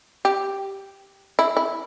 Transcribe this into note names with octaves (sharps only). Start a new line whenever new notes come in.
G4
E4
E4